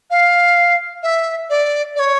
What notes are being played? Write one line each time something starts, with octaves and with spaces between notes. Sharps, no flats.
F5
E5
D5
D5
C#5